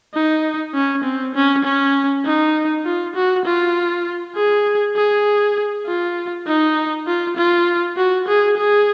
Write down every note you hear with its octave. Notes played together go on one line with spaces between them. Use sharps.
D#4
C#4
C4
C#4
C#4
D#4
F4
F#4
F4
G#4
G#4
F4
D#4
F4
F4
F#4
G#4
G#4